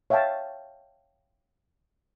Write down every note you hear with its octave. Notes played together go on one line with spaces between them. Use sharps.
C#5 E5 F5 G5 A5